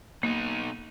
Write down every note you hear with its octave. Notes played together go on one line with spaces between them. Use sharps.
B2 A#3 D#4